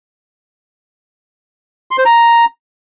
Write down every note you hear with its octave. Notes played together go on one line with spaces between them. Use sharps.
C6
C5
A#5